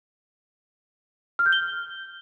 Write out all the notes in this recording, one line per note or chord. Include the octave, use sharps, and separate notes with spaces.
F6
G6
G7